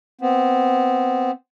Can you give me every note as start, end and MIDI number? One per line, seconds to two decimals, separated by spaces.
0.21 1.31 59
0.21 1.31 60